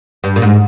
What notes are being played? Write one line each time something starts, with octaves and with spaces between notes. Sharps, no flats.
G2
A#2
G#2